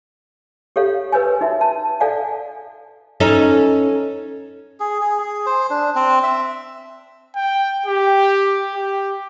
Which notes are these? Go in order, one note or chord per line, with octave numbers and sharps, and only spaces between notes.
G4 A4 C#5 F5
A#4 B4 C#5 G#5
D#4 F#4 E5
A5
A4 D5 F5 F#5 G#5
C#4 D#4 A4
G#4
G#4
G#4
C5
D4
C4
E5
G5
G4
G4